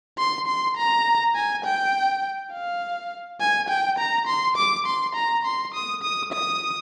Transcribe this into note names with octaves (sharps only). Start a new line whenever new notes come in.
C6
C6
A#5
G#5
G5
F5
G#5
G5
A#5
C6
D6
C6
A#5
C6
D#6
D#6
D#6